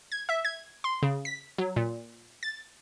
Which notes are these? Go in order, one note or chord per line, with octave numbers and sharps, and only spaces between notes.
G#6
E5
G#6
C6
C#3
B6
F#3
A#2
A6